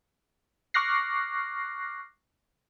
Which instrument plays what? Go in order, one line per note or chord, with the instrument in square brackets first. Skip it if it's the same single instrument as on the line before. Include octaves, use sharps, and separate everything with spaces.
[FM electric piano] C#6 D6 F6 F#6 A#6 C7